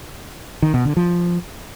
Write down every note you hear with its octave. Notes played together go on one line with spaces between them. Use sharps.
D#3
B2
D3
F3